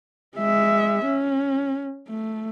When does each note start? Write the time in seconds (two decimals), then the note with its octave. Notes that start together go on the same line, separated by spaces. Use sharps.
0.37 G#3 E5
1.05 C#4
2.08 A3